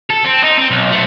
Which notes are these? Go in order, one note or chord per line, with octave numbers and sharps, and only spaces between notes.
A4
C4
D#4
C4
B1
A3 C4